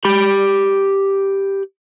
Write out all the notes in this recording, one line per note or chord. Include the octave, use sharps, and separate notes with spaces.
G4 B5